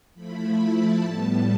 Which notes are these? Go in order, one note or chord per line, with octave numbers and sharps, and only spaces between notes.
F3 A3 E4 B5
A5
A2 G3 B3